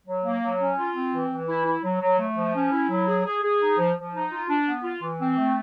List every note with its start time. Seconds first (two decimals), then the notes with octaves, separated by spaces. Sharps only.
0.07 F#3
0.24 A#3
0.41 F#3
0.60 C#4
0.78 F4
0.95 C4
1.13 E3
1.30 E3
1.48 E4
1.65 E4
1.84 F#3
2.01 F#3
2.19 A3
2.36 F3
2.55 C#4
2.71 E4
2.89 F#3
3.07 G#4
3.25 G#4
3.43 G#4
3.61 D#4
3.78 F3
3.96 F3
4.14 D#4
4.31 F4
4.49 D4
4.66 B3
4.84 F4
5.02 E3
5.20 C4
5.37 A3